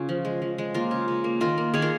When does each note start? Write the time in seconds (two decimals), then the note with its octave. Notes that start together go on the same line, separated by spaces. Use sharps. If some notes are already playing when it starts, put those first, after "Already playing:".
Already playing: C#3 C#4 F4
0.09 F3
0.25 G#3
0.42 F3
0.58 G#3
0.74 A#3 F4 A#4
0.91 C#3
1.08 C#3
1.24 A#3
1.40 D#3 F4 A#4
1.58 A#3
1.74 D#3 G#4 C#5
1.82 F4 A#4